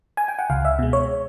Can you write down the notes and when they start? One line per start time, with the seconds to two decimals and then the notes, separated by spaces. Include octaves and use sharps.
0.17 G#5
0.28 G5
0.39 F#5
0.50 C#2 F5
0.65 E5
0.79 B2 G#3
0.93 C#5